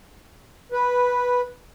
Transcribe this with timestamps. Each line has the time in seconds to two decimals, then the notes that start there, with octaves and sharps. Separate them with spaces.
0.72 B4